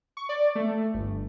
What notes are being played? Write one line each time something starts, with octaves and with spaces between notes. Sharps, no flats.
C#6
D5
A3
G1